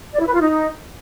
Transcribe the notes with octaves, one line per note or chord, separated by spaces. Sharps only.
D5
E4
B4
F4
D#4